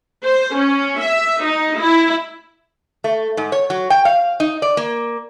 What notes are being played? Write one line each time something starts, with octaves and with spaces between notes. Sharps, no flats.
C5
C#4
E5
D#4
E4
A3
G#2
C#5
F#3
G5
F5
D#4
D5
A#3